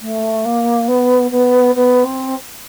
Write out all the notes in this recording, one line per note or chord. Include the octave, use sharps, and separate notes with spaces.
A3
A#3
B3
B3
B3
C4